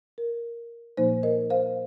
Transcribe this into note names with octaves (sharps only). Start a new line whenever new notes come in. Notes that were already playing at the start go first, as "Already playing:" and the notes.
A#4
A#2 F3 A#3 D#4 C5
A#4 D#5
C5 F5